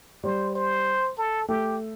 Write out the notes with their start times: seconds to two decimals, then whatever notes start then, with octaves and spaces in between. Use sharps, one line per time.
0.24 G3 C5
0.55 C5
1.18 A4
1.49 A3 G4